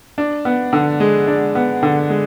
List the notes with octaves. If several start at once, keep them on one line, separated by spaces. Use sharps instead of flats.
D4
B3
D3
G#3
D4
B3
D3
G#3